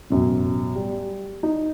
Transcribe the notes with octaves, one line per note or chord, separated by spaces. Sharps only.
A1 F#2 B2
G3
D#4